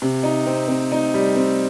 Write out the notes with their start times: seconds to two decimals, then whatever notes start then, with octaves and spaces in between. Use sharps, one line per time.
0.02 C3
0.23 D#4
0.46 C4
0.68 C4
0.92 D#4
1.14 G3
1.36 C4